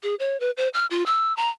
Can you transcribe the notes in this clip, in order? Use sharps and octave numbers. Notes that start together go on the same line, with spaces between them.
G#4
C#5
B4
C5
F6
F4
E6
A#5